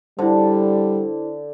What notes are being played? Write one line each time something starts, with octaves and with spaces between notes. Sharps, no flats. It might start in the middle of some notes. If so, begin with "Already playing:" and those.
D3 G3 E4 C5